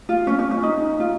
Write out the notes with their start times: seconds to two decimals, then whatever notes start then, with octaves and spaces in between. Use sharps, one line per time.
0.09 F4
0.27 C#4
0.39 C#4
0.51 C#4
0.63 D#4
1.00 F4